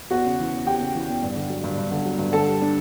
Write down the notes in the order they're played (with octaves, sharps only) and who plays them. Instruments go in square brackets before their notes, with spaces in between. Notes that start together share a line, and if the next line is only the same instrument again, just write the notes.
[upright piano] E2 F#4 F#5
C#3
E3
E2
E2 G4 G5
C#3
E3
E2
G2
D3
F#3
G2
G2
D3
F#3
G2
D3 A4 A5
G3
D4